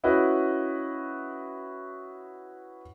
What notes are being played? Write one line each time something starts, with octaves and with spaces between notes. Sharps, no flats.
C#4 E4 F#4 B4 D#5